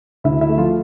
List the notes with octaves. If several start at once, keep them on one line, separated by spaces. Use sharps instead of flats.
D2 E4 E5
E4 E5
A3
F3 F4